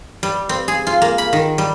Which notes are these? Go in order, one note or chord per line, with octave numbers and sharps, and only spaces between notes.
G3
C4
G#4
F4
A#3
B5
D#3
G3